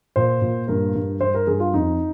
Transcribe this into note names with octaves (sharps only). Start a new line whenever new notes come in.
A#2 C5
A#2
G2 A#4
G2
G2 C5
A#4
G2 G#4
F4
F2 D#4